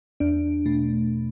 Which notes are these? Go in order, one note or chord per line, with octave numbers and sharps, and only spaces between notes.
E2 D4
B2 A3